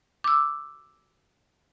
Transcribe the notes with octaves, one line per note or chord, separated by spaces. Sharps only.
D6 E6